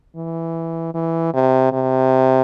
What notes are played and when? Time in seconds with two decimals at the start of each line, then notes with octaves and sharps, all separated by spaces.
0.16 E3
0.94 E3
1.34 C3
1.72 C3